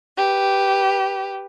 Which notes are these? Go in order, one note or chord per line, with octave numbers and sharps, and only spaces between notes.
G4 B4